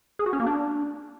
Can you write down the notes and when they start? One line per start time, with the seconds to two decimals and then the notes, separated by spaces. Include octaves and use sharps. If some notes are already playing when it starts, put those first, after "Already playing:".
0.19 G#4
0.26 F#4
0.33 C#4
0.40 A#3
0.47 D4